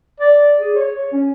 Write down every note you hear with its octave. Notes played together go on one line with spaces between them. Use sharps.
D5
G#4
C#5
C#4